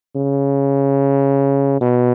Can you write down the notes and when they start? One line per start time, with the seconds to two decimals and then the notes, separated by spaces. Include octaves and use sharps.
0.16 C#3
1.81 B2